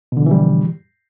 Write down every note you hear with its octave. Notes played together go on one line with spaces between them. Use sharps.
B2 D3 E3 F3 G3